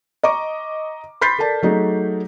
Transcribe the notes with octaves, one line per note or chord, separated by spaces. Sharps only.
D#5 A#5 C#6 D6
B5 C6 G6 A6 B6 C7
A4 A#4 D5 A5
F#3 A3 D#4 G#4